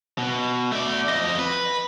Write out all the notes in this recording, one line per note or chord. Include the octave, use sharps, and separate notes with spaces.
B2
A3 D5
F2 D#5
B4